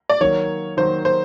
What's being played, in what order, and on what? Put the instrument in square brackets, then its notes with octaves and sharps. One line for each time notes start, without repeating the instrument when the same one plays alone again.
[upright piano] D5
[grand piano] D#3 F#3 A#3 [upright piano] C#5
[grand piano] D#3 F#3 A#3 [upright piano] C5
[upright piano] C5